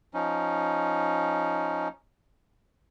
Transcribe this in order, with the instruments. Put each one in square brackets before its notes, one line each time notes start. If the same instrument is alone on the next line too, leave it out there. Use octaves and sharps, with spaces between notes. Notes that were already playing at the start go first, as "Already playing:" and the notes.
[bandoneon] F3 C#4 D#4